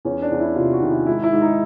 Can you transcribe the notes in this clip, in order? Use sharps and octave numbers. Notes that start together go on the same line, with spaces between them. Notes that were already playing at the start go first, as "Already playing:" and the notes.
E2 C#4
D4
E2
E4
C3 F4
F#4
D#3
E4
G#2 E4
E4
G#2
D#4